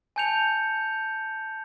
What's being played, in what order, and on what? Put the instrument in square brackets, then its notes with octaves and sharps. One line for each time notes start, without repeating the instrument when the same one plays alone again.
[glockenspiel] G#5 A5 G6 C#7 F7